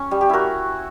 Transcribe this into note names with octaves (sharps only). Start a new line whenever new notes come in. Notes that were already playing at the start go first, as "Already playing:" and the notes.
Already playing: C#4
G3
G4
E4 F#4 A#4